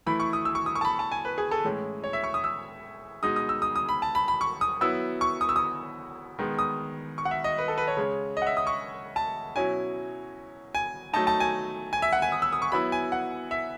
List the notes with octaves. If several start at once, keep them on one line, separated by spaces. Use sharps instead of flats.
E3 A3 E4 B5
C#6
D#6
E6
C#6
D#6
C#6
A5
B5
A5
G#5
B4
G#4
A4
A2 E3 G#3 C#4 E4
C#5
E5
C#6
D#6
E6
B2 G#3 D#4 D#6
D#6
E6
D#6
D#6
B5
A5
B5
B5
C#6
D#6
F#3 B3 E4 E6
C#6
D#6
E6
D#6
D#3 G#3 B3
D#6
C#6
F#5
E5
D#5
B4
A4
B4
C#5
C#3 G#3 C#4
D#5
F#5
E5
D#6
C#6
A5
B2 F#3 C#4 E4 G#5
G#5
F#3 A3 D#4 A5
A5
G#5
G#5
E5
F#5
G#5
D#6
E6
D#6
C#6
F#3 B3 E4 B5
G#5
F#5
E5